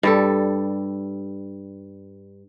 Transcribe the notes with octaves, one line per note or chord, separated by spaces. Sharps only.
G2 G3 A4